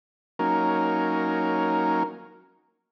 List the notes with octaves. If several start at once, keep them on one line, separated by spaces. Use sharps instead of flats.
F#3 A#3 C#4 D#4 A#4